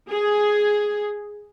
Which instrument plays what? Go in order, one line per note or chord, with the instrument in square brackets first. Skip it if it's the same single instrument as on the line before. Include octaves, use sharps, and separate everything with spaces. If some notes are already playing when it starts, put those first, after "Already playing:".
[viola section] G#4